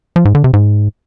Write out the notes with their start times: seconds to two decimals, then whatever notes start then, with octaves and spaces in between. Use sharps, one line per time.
0.16 F3
0.25 G#2
0.35 D3
0.44 C3
0.53 G#2